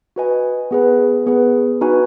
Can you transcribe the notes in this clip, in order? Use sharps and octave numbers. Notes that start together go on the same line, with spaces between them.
F#4 B4 D#5 G#5
B3 G#4 B4
B3 G#4 B4
D#4 F#4 B4 G#5